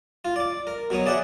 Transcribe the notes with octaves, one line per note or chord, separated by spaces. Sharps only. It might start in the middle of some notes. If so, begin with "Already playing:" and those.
F4
D5 D6
A#4
B2 F#3 C#5 D#6
G#4 D5 E5 F#5 G5